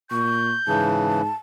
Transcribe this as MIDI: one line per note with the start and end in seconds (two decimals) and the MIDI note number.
0.11 0.53 46
0.11 0.52 85
0.11 0.89 91
0.68 1.27 44
0.68 1.22 49
0.68 1.22 52
0.68 1.35 81